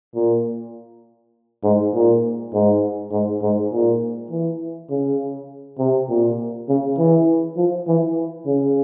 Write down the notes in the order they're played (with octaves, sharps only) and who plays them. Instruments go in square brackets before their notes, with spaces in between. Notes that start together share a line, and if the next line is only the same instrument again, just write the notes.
[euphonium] A#2
G#2
A#2
G#2
G#2
G#2
A#2
E3
C#3
C3
A#2
C#3
E3
F3
E3
C#3